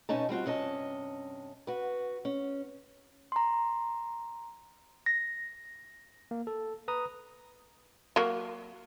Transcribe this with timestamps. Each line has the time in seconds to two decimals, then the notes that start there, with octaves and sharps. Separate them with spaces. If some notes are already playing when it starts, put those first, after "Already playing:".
0.09 B2 A3 C#4 D#4 A5
0.29 G3 C4 F4 F#4
0.45 G2 C3 C#4 F4 D#5 A5
1.67 F#4 B4
2.25 C#4
3.32 A#5 C6
5.06 A#6
6.31 A#3
6.47 A4
6.88 B4 A#5 D#6
8.16 F#3 A#3